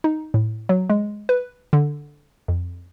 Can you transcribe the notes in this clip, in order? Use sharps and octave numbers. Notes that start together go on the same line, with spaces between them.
D#4
A2
F#3
G#3
B4
D3
F2